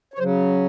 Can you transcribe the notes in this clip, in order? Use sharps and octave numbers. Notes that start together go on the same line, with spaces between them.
C#5
C#3 F#3 C5